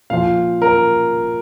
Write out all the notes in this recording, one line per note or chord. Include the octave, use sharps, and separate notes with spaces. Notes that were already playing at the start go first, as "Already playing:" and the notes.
A#2 F3 F5
A#4